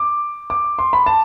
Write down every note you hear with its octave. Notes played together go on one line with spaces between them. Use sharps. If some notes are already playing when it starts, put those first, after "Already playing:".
Already playing: D6
D6
C6
B5
A5